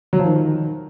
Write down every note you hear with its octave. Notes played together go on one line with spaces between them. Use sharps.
F#3
F3
D#3